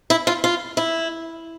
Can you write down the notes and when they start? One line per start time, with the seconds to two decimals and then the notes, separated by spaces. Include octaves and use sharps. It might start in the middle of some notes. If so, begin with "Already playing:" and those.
0.10 E4
0.27 F4
0.44 F4
0.77 E4